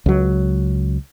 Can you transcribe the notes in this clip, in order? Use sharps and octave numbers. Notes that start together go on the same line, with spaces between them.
C#2 F#3